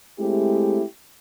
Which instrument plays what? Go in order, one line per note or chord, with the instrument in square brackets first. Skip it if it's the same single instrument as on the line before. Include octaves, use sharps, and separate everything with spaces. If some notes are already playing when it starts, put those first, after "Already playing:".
[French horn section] G#3 A3 C4 E4 G4